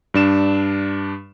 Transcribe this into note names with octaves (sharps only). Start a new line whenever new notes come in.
G2 D4 E7